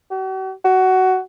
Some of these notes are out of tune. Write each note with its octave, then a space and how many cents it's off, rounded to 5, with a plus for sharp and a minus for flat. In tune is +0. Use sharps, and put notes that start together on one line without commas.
F#4 +45
F#4 +15